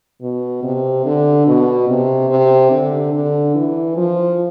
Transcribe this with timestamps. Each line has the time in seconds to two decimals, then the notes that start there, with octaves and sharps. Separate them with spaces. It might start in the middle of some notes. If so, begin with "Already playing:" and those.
0.21 B2
0.63 C3
1.05 D3
1.47 B2
1.88 C3
2.29 C3
2.71 D3
3.14 D3
3.55 E3
3.97 F3